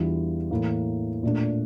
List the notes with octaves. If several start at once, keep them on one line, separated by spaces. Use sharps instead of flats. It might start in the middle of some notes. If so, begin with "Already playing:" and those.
Already playing: E2 E3 G3 D4 F4
A2 E3 A#3
A#2 A3 D4